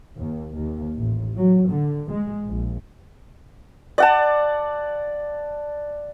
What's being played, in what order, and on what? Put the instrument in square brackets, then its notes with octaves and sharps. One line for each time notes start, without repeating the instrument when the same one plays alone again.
[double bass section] D#2
D#2
A1
F#3
D3
G#3
A#1
[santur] D5 F#5 A5